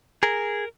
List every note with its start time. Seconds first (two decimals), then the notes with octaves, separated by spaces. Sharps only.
0.23 G#4 A#4